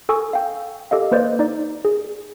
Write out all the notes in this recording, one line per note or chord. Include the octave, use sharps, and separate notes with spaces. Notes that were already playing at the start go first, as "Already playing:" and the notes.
A4 G#5 C#6 D#6 E6
F5 G5
G4 A4 D#5 F5
A#3 B4 C5 D5 D#5
D#4 D5
G#4